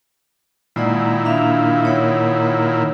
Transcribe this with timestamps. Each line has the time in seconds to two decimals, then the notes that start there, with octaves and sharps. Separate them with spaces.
0.76 A#2 D#3 G#3 E4 D5 F#5
1.25 D4 E5 F5
1.83 D#4 C#5 F#5